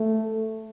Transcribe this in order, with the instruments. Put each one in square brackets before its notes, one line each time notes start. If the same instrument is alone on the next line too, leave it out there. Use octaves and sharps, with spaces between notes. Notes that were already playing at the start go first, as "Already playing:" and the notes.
Already playing: [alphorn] A3